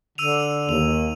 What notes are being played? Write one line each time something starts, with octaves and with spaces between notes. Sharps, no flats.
D3 E6 D#7 F7
D#2 F7